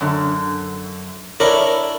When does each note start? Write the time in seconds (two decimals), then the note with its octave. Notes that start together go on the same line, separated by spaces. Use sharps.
0.01 F#2 D3
1.40 D4 E4 A#4 C#5